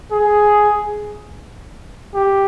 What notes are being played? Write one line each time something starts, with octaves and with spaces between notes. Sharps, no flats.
G#4
G4